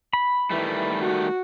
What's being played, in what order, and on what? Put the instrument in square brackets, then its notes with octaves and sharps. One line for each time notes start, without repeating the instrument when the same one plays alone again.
[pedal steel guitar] B5
[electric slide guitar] D#3 G3 A3 [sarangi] E3
[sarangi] F#4